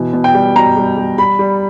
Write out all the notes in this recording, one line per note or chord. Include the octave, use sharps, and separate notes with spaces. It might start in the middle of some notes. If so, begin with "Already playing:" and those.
Already playing: B2 E3
B2
G5
G3
B2 A#5
G3
G3
G3 B5
G3